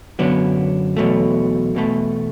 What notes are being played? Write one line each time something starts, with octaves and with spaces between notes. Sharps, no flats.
F#2 D3 F#3 B3 D4
E2 B2 F#3 A3
E2 B2 A3